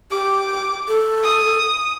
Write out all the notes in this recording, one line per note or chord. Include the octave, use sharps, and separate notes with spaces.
G4 D6
A4
D#6